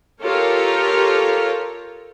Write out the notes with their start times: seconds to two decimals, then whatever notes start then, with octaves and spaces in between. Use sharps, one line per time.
0.23 F4 G4 A4 A#4 C#5